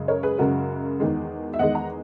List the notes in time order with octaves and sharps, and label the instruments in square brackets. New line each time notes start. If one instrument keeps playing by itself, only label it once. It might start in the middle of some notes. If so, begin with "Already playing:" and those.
Already playing: [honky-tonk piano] F#2 C#3 G#3
A#4 C#5
G#4 B4
F#2 C#3 G#3 F#4 A#4
E2 D#3 G#3
E5
E2 D#3 G#3 D#5 F#5
F#5 A#5